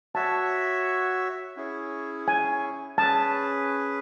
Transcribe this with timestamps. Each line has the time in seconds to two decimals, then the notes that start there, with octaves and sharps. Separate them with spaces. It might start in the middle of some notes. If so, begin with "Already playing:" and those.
0.15 F#4 C#5 E5 A5
1.57 C#4 E4 G#4 C#5
2.28 G#5
2.98 C#4 G#4 B4 A5